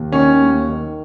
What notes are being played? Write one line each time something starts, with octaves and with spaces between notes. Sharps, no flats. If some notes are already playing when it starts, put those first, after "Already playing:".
Already playing: D#2
D#3 C#4
D#2
D#3